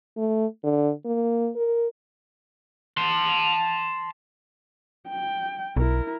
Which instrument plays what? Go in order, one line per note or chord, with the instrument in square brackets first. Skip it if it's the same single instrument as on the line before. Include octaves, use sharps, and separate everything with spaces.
[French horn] A3
D3
A#3
A#4
[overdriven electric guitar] A5 C6
[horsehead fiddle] G5
[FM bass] B1 [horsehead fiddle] E4 A#4